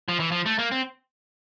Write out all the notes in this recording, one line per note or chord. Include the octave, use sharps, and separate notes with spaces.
F3
E3
F3
A3
A#3
C4